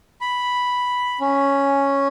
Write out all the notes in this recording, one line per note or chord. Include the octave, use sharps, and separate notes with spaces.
B5
C#4